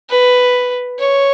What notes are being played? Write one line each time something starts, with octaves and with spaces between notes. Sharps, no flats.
B4
C#5